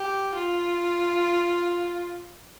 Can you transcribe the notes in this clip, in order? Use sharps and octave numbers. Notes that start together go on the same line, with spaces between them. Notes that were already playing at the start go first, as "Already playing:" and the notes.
Already playing: G4
F4